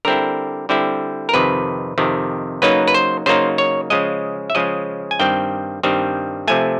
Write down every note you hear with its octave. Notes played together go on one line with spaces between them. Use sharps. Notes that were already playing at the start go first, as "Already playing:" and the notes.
D3 G3 C4 E4 A#4
D3 G3 C4 E4
A#4
F2 C3 D#3 B4
F2 C3 D#3
C#3 F#3 A#3 D#4 B4
B4
C5
C#3 F#3 A#3 D#4 C5
C#5
C#3 F3 G#3 D#5
E5
C#3 F3 G#3 D#5
G#5
G2 D#3 G3 C4 G5
G2 D#3 G3 C4
C3 F3 A3 G#5